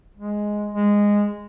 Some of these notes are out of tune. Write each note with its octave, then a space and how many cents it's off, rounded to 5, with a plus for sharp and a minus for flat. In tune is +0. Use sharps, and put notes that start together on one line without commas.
G#3 +5
G#3 -10